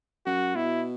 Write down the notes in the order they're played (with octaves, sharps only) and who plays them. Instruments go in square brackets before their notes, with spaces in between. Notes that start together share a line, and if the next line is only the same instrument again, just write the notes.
[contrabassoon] F#2 [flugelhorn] F#4
[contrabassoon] B2 [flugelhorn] E4